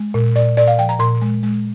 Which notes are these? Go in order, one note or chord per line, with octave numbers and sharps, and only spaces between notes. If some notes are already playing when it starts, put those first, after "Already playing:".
Already playing: G#3
A#2
A#2 D5
A#2 D5
F5
F3 G5
A#5
A#2 C6
G#3
G#3